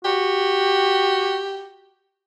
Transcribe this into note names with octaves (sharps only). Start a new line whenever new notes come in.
F#4 G4